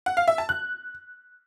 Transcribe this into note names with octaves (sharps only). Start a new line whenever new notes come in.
F#5
F5
E5
A5
F#6